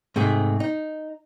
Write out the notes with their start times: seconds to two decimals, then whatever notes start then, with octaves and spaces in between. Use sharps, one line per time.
0.16 G#2 C3 A3 G#4
0.60 D#4